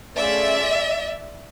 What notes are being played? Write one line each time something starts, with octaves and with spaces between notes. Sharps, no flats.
A3 C#4 F4 G#4 D5 E5